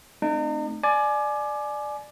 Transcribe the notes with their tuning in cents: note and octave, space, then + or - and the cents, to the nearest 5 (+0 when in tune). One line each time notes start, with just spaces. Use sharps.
A3 +0 C4 +0 D#4 -40
D5 +15 G#5 +30